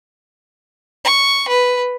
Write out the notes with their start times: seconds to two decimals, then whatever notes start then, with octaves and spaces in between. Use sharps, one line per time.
1.05 C#6
1.48 B4